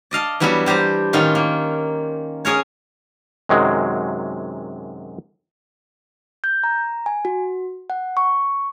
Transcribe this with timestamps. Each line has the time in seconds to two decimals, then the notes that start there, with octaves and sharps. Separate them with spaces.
0.11 D5 D#5 F5 A5
0.40 E3 F#3 G3 B3 D4 E4
0.66 G3 G4 C5 A#5
1.13 A2 D#3 C#4 F4
1.35 A#3
2.45 C#4 G#4 A#4 C#5
3.49 F#2 C3 D#3 F#3 G#3
6.44 G6
6.64 A#5
7.06 G#5
7.25 F#4
7.90 F#5
8.17 C#6